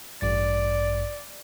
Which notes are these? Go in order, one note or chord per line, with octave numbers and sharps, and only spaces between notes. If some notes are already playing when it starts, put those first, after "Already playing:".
A1 G2 D5 A6